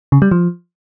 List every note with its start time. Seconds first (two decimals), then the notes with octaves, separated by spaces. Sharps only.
0.12 C#3
0.22 G3
0.31 F3